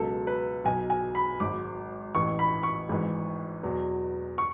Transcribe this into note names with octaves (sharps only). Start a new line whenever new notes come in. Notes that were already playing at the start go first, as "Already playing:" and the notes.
Already playing: C#2 B2 F#3 A4
B4
B1 B2 F#3 G#5
G#5
B5
G#1 G#2 F#3 D6
A1 A2 E3 C#6
B5
C#6
G#1 G#2 E3
E2 B2 F#3
C#6